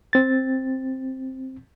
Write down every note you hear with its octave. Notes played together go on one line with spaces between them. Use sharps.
C4 A6